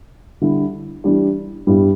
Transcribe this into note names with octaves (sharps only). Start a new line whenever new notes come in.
D3 G3 E4
E3 G3 D4 G4
G2 G3 E4 G4